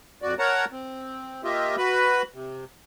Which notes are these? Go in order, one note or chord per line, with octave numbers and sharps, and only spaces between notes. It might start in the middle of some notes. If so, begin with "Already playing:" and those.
F2 F#4 D5
A#4 C#5 F#5 A5 A#5
C4
A#3 F4 G4 D#5 E5
F#4 B4 B5
C3